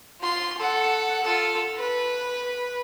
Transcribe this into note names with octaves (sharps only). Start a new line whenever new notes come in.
F4 C6
A4 F#5
F4 A4
B4